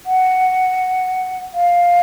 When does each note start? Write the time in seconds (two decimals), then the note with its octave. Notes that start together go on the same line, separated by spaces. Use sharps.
0.06 F#5
1.54 F5